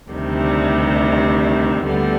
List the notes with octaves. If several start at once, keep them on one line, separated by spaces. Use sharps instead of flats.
D2 C3 D#3 G3
D2 D3 G3 B3